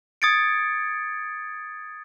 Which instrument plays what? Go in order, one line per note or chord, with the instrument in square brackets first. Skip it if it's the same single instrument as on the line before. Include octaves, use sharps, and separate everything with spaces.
[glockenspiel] D#6 G#6 A6 C#7 D7